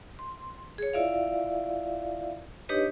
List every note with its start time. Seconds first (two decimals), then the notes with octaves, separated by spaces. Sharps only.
0.19 C6
0.78 G#4 C#5
0.93 E4 F4 D5 E5 F5
2.69 D4 D#4 G4 B4 C#5 D#5